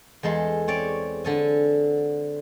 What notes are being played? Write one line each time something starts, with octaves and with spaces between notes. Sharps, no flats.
E2 G#3 A4 C6
C4 C#5 D5
D3 A4 G#5